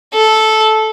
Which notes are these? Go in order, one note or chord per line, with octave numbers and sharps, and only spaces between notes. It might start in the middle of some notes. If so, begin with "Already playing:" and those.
A4